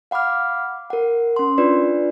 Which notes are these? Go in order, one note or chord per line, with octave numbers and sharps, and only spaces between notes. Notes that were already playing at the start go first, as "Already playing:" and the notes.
F5 F#5 B5 D6 F6
A#4 F#5
C#4 C6
D4 F4 B4 D5